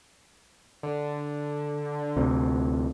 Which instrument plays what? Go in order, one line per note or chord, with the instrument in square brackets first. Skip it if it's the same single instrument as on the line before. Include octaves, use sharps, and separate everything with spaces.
[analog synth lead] D3
[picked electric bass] D2 C3